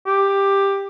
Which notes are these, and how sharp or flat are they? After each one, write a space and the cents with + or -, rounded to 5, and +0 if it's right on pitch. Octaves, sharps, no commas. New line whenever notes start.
G4 +10